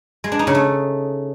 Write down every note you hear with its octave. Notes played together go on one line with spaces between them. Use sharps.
G#3
D4
D#4
C#3
A3